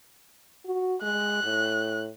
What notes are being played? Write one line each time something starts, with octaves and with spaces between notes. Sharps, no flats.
F#4
G#3 F#6
A2